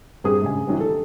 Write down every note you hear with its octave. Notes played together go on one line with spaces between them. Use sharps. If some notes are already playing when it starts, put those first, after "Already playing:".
G2 C4 G4 G#4 D#6
G#2 C#3 G#5
D#3 E3 F#3 G3 C4
A4